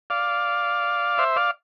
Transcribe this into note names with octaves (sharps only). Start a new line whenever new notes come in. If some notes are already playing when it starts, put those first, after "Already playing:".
D5 F5
C5 E5
D5 F5